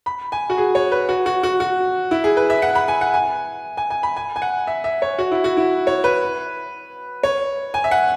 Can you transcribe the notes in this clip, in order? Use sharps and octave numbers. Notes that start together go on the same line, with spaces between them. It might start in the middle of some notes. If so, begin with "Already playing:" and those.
B5
G#5
F#4
G#4
C#5
B4
F#4
F#4
F#4
F#4
E4
G#4
B4
E5
F#5
B5
G#5
F#5
G#5
G#5
G#5
B5
G#5
G#5
F#5
E5
E5
C#5
F#4
E4
F#4
E4
C#5
B4
C#5
G#5
E5
F#5